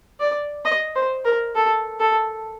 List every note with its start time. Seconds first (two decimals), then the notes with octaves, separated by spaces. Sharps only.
0.20 D5
0.65 D#5
0.95 C5
1.25 A#4
1.55 A4
2.00 A4